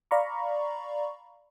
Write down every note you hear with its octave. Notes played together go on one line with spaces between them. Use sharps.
D5 F5 A#5 B5 C#6